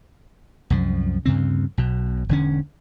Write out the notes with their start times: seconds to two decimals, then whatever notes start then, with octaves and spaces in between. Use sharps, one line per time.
0.70 C2 F#2 F3
1.25 D2 G2 C#3 C4
1.78 B1 B2
2.29 E1 D3 C#4